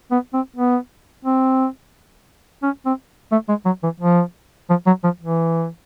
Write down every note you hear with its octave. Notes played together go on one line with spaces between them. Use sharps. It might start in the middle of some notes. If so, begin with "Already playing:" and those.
B3
C4
B3
C4
C#4
C4
A3
G#3
F#3
E3
F3
F3
F#3
F3
E3